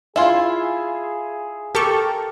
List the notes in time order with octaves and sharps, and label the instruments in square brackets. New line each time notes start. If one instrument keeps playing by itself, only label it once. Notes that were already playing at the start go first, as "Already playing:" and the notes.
[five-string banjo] E4 F4 [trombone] G#4 [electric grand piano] E5 G#5 C6
[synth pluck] G4 A4 C#6 [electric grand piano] A#4 A5